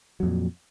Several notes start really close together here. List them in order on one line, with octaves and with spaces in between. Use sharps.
F#3 F2 A#2